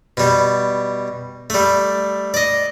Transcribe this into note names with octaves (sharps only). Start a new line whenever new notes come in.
B2 G3
G3 A3
D5 D#5